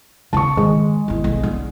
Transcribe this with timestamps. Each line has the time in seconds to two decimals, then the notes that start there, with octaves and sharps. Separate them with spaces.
0.33 C#3 C#4 A5 C#6
0.57 D#3 G#3
1.08 D#3 E4
1.24 B1
1.43 D3